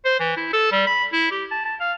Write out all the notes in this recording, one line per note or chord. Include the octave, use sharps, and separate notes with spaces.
C5
E3
E4
A4
G3
B5
E4
G4
A5
A5
F5